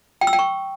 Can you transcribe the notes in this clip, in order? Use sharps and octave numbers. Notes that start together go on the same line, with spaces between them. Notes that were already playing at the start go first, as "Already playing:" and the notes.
G5
E6
G5
C#6